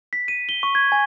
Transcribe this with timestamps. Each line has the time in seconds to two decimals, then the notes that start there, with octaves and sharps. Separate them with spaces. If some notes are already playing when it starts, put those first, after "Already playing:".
0.13 B6
0.28 D#7
0.49 G7
0.63 C#6
0.75 G#6
0.92 G#5